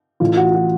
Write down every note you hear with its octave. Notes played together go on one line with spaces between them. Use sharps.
A1 A2 E3 F4
F#4
F#4